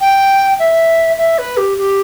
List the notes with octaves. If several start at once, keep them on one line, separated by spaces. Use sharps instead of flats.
G5
E5
E5
B4
G4
G4